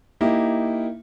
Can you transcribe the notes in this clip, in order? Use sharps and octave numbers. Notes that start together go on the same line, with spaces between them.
A#3 D#4 E4 G4